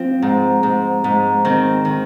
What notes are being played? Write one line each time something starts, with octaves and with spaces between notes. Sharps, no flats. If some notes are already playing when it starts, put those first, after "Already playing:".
Already playing: F3 C4 F4
G#2
G#2
G#2
D#3 C4
D#3